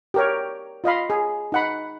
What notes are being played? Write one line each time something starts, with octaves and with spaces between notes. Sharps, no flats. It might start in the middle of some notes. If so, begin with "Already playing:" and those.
G4 A#4 C#5
F4 D#5 F5 B5
G#4
D#4 F#5 B5